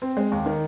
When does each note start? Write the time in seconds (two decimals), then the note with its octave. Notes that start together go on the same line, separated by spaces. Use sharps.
0.02 C4
0.17 G#3
0.32 D#2
0.46 D#3